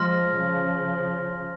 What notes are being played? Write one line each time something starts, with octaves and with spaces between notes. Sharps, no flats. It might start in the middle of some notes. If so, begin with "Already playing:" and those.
Already playing: F3 G#3 C6 F6 A#6
C#3 F3